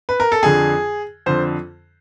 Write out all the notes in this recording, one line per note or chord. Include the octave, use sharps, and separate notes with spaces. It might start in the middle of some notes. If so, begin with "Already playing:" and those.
B4
A#4
A4
F2 D3 G#4
F2 D3 C5